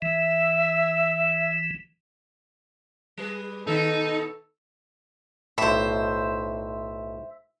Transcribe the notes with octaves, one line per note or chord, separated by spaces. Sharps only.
E3 E5
G3 G#4 B4
B2 D#3 B3 D#4 A4
B1 A2 C5 E5